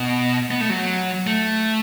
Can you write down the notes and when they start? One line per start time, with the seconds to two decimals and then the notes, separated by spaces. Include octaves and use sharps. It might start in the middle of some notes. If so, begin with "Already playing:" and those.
Already playing: B2
0.51 B3
0.61 A3
0.70 F#3
1.27 A3